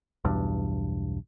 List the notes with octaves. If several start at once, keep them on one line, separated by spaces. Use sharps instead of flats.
B1 E2 G2